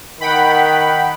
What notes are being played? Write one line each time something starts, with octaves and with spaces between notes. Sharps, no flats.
D#3 F#5 G5 B5